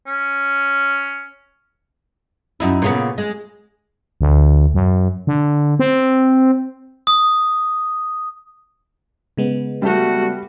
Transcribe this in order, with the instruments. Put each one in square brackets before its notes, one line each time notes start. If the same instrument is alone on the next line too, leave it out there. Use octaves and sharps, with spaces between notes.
[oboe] C#4
[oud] F#2 D#4 E4
A#2 C#3 B3
G#3
[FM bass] D2
F#2
D3
C4
[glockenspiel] D#6
[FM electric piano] C#3 G#3 B3
[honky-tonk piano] G3 [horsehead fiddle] A3 F#4